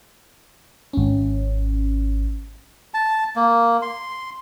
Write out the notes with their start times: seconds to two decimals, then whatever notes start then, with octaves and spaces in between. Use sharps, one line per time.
0.93 G#1 C#4
2.94 A5
3.36 A#3
3.82 C6